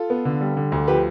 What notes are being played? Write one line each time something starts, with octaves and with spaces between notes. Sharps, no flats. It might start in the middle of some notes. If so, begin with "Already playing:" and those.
Already playing: F4 A4
B3
D3
G3
D3
D2
F3 G4 B4